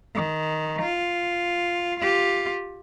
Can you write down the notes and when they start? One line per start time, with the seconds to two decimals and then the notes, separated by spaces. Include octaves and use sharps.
0.15 D#3
0.82 F4
2.00 F4 G4